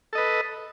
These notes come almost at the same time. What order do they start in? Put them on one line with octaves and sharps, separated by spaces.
A4 D#5 B4